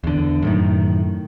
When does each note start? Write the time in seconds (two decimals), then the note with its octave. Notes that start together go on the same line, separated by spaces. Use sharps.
0.04 E2 D3
0.42 F#2 A2 D#3